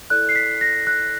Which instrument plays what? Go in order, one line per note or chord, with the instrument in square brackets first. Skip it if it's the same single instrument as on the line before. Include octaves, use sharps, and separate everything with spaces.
[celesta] E4 A4 D5 F#6
C7
B6
A#6
F#6